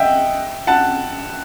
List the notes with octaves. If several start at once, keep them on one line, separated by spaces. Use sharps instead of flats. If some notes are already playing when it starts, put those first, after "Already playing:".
Already playing: D#5 E5 F#5 G5
F#5 A5